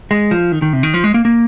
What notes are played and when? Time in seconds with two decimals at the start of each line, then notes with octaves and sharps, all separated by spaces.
0.11 G#3
0.31 F3
0.52 D#3
0.62 D#3
0.73 C3
0.83 D#3
0.94 F3
1.04 G#3
1.14 A#3
1.25 A#3